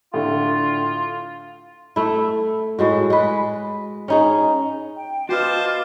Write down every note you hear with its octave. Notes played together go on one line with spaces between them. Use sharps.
A2 D3 F4
A3 E4
A2 G#3 F#4
G#3 B4
C#4 D#4 G#4
G5
F4 F#4 B4 C5 D#5 A5 D6